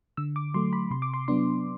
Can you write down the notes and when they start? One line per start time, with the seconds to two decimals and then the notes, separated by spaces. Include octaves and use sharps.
0.17 D3 E6
0.36 D6
0.54 F#3 A3 C6
0.73 B5
0.91 C3 C6
1.02 D6
1.14 C6
1.28 F#3 B3 D4 C6